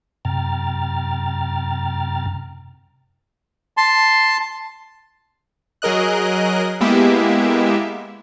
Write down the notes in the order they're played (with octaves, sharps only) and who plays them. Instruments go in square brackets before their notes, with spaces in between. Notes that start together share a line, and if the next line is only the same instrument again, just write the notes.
[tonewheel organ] F#2 C3 G5 A#5 F6 A6
[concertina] A5 C6
[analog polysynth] F#3 G#4 A#4 D#5 F#6
G#3 A#3 B3 E4 G4 E5